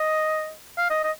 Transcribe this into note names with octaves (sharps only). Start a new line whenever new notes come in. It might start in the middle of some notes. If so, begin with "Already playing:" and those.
Already playing: D#5
F5
D#5
D#5